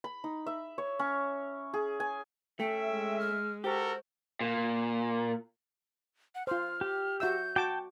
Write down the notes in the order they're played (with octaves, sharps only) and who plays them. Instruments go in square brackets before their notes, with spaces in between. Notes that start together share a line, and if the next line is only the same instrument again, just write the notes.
[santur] B5
D#4
E5
C#5
C#4
G#4
G#5
[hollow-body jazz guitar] A3 [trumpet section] C#4 E5 [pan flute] G5
[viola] G#3
[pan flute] F6
[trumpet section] F#4 A4 A#4 [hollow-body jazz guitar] G4 [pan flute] C5
[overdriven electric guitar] A#2
[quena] F#5
[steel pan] F4 C5 [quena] F6
[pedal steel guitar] G4
[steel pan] F#4 E5 E6 [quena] G6
[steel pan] F#4 D6 [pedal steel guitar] G5 A5